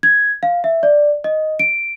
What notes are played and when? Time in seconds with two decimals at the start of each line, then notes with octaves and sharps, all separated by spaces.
0.03 G#6
0.43 F5
0.64 E5
0.83 D5
1.24 D#5
1.59 D7